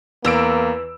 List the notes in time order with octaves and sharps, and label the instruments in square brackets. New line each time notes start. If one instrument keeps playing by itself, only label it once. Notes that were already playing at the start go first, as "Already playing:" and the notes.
[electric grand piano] E2 E6 D7 [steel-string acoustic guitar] E3 [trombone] A#3